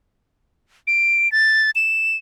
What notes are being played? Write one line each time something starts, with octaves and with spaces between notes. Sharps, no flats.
D7
A6
E7